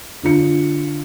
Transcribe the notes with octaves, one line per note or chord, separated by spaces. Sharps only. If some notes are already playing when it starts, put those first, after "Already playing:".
D3 F4 C#7